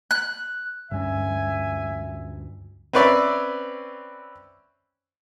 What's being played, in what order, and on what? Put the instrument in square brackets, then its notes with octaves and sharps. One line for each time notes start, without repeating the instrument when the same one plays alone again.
[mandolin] F#6
[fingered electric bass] D2 F#3 C#4 [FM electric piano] G2 [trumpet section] E5 G#5
[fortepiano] C4 C#4 B4 C#5 D5 E5